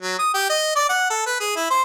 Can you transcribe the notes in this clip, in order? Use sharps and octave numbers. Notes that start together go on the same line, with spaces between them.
F#3
D#6
G4
D#5
D5
F#5
A4
B4
G#4
E4
C5